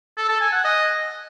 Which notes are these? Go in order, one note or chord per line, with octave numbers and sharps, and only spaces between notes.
A4
A4
G#5
F#5
D#5